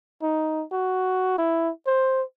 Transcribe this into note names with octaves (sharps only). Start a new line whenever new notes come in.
D#4
F#4
E4
C5